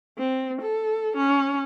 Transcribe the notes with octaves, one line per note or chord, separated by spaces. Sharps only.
C4
A4
C#4